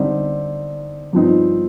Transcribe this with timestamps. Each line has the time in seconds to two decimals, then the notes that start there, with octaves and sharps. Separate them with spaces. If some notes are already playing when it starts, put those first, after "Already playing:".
Already playing: D3 G3 C4 D#4
1.13 G2 F3 C4 D#4